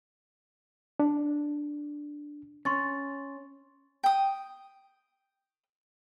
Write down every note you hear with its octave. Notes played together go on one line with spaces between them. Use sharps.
D4
C#4 C6 C#6 A6
G5 D#6